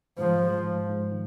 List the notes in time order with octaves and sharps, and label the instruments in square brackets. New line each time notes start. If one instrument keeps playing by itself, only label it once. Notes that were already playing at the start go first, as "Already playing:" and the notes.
[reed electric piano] G#2 [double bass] F3
[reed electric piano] G#3
G#2
G#2
D#3